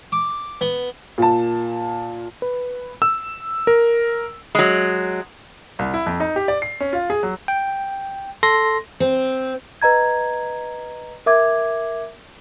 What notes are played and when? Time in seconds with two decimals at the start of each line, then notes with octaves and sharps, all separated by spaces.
0.12 D6
0.61 B3
1.18 A#2 A5
2.42 B4
3.02 E6
3.67 A#4
4.55 F#3 G#3
5.79 C2
5.94 E4
6.06 F2
6.20 D#4
6.36 G4
6.48 D5
6.62 C7
6.80 C#4
6.93 F4
7.10 G#4
7.23 F#3
7.48 G5
8.43 A4 C6 A#6
9.00 C4
9.82 B4 D#5 A#5 G#6
11.26 A#4 E5 D6 G#6